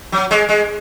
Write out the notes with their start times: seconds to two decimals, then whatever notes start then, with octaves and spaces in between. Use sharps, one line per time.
0.12 F#3
0.31 G#3
0.49 G#3